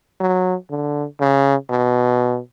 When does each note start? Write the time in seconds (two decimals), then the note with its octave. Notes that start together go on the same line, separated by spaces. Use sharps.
0.20 F#3
0.70 D3
1.20 C#3
1.69 B2